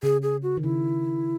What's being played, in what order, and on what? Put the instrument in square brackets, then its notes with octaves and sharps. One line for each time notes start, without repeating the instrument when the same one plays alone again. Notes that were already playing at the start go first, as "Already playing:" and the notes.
[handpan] C#3 [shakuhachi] G#4
[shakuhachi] G#4
F#4
[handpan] D#3
[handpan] C#3 [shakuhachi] E4